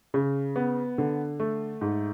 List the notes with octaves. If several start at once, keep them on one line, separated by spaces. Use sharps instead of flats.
C#3
B3
D3
A3
G#2